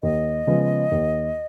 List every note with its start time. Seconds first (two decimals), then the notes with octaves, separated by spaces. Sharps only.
0.03 D#2 D#5
0.47 C#3 F3 G#3 B3
0.91 D#2